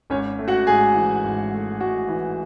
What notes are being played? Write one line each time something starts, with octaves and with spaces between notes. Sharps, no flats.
G#1 C#4 C#5
A3
F#4 F#5
G#2 G#4 G#5
E3
G#1
A3
G#2 F#4 F#5
E3